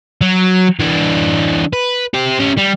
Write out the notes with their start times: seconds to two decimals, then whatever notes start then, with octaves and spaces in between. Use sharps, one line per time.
0.21 F#3
0.80 E3 D4
1.73 B4
2.14 G4 C5
2.40 C#4 G4
2.58 G3